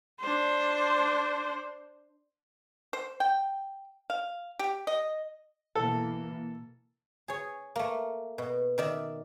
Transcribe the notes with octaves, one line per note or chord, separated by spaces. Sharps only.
D4 C5
C5
G5
F5
G4
D#5
B2 E3 A#3 A4
G#4 C#5
A3 A#3
B2
D#3 D5 E5